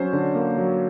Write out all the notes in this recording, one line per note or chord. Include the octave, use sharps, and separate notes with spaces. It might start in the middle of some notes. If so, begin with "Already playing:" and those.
Already playing: F#3 C#4 C5
D3
A#3
F#3